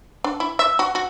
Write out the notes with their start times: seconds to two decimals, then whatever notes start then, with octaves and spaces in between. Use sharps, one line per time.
0.24 D4
0.40 E4
0.59 E5
0.79 F#4
0.95 F#4